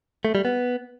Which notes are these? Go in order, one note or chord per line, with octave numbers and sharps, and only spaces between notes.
A3
G3
B3